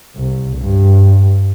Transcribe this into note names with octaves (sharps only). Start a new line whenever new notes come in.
C2
G2